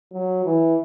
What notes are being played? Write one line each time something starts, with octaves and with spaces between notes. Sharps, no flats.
F#3
E3